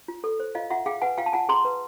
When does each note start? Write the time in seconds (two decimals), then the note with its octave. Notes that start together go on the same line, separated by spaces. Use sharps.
0.08 F4
0.24 A4
0.40 C5
0.55 F4 D#5 F5
0.70 F4 E5 F#5
0.86 G#4 F5 G5
1.02 B4 F#5 G#5
1.18 F4 F5 G5
1.26 A5
1.33 F4 F#5 G#5
1.49 G#4 A#5 C6
1.65 B4